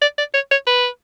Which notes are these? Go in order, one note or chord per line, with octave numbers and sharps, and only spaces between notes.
D5
D5
C#5
C#5
B4